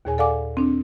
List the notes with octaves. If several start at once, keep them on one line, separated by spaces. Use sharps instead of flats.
D#2 A#2 G#4 C#5 G#5
A4 D5 F5 F#5 G#5 D6
C4 D4